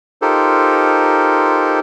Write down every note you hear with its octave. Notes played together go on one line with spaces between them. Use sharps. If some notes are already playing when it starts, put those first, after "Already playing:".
D#4 F4 G4 A4 A#4 C5